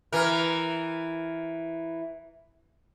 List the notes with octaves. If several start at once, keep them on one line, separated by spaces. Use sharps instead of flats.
E3 A#4